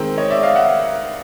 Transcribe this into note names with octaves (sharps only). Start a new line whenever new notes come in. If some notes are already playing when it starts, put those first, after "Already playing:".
Already playing: D#3 G#3 C4 A#4
C#5 D#5
D5 E5
D#5 F5
E5 F#5